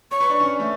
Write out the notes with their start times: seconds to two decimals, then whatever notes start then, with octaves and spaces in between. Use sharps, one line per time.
0.11 C#5 C#6
0.21 B4
0.30 D4
0.40 C#4
0.60 A3